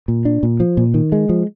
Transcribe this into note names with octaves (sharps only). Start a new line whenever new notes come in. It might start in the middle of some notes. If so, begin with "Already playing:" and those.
A#2
D4
A#2
F3
A#2
D#3
G#3
F3